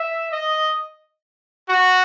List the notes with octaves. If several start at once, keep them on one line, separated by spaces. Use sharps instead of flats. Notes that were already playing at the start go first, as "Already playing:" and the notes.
Already playing: E5
D#5
F#4